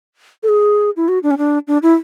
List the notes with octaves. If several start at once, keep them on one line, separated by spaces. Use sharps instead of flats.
A4
G#4
E4
F#4
D4
C#4
D4
D4
E4